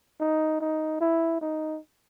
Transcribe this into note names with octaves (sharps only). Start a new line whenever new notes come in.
D#4
D#4
E4
D#4